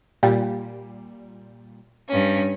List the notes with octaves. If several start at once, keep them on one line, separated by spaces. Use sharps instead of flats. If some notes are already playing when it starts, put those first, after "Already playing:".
A#2 G3
G2 C#4